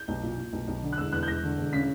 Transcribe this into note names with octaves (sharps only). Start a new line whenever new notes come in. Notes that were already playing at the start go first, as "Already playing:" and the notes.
Already playing: G6
B1
A#2
A#2
B1
B1
D3
F#6
E1 E6
E2 F#6
G6
E1 A#6
D3
E1
C#3 B6